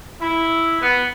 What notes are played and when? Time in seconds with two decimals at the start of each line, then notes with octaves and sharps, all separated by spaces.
0.21 E4
0.81 B3